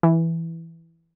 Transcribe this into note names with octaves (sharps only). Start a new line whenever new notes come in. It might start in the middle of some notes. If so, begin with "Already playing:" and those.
E3